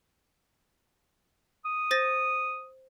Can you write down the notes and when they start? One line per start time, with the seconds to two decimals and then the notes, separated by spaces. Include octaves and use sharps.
1.65 D#6
1.91 C5 A6 A#6